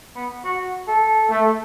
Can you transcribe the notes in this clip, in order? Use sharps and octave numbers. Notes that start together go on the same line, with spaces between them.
B3
F#4
A4
A3